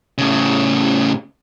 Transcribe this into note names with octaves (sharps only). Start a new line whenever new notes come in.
A2 C#3